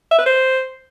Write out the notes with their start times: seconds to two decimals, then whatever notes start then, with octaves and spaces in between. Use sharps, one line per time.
0.11 E5
0.19 B4
0.26 C5